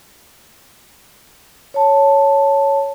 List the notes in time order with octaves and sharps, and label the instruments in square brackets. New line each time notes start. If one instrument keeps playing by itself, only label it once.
[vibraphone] C#5 A5